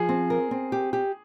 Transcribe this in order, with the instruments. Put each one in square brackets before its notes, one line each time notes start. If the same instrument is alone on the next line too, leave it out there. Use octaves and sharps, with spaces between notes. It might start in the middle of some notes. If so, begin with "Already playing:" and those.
Already playing: [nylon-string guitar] F3 [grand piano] G#4
[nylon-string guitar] C4
A#4
C4
G4
G4